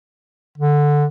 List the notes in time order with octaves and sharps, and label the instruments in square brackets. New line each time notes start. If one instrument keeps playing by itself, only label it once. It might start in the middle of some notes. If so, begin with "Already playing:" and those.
[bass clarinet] D3